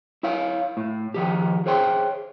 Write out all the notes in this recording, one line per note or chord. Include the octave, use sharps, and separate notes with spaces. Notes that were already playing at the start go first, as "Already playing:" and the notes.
E4 C#5 F5
A2
D#3 F3 G4
G#4 C5 C#5 G5 C6